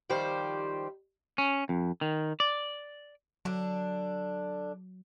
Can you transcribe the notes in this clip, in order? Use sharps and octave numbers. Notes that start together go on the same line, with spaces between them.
D#3 F3 G3 G4 C5
C#4
F2
D#3
D5
D3 F#3 D4